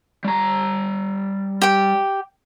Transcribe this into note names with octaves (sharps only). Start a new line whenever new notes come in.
G3 A#5
G4 G5